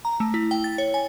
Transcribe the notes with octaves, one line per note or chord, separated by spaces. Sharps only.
A#5
A3
E4
G5
A6
C#5
G#5